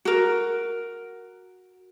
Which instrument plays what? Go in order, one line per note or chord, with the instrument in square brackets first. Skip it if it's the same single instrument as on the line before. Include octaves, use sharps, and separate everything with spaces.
[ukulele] F#4 A#4